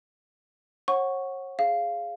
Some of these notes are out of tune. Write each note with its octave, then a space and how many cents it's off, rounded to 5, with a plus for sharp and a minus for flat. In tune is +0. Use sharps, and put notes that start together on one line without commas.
C#5 -35 F#5 +0 C#6 +0
G#4 +0 F5 -10